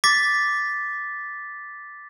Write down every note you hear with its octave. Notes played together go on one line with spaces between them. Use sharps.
D6 A6 B6